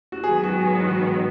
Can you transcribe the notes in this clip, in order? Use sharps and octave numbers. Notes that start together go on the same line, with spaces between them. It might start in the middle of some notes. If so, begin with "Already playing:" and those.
F#4
G#2 D#3 F#3 B3 G#4
F#4
G#4
F#4